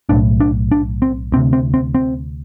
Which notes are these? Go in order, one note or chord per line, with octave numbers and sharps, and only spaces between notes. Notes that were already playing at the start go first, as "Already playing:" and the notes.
B1 A2 D4
D4
D4
C4
D2 C3 C4
C4
C4
C4